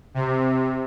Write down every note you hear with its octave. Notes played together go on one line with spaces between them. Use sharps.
C3